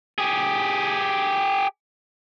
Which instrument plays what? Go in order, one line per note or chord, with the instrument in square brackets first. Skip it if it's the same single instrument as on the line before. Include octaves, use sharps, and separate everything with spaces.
[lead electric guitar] G4 G#4